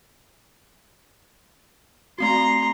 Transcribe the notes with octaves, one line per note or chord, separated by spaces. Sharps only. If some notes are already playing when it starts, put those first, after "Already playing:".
A3 C4 F#4 A#5 C6